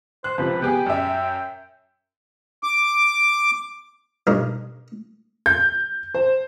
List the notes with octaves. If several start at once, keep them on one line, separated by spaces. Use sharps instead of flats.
C5 F#6
C#2 C3 F3 B4
B3 G4 G#4 G5
F#2 E5
D6
B1 G2 A#4
G6
C5